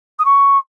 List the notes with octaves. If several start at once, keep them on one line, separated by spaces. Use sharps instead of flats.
D#6
C#6